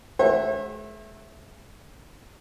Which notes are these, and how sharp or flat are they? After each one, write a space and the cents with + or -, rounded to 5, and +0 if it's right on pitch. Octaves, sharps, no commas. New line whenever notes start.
G#3 +45 C#5 -45 E5 +0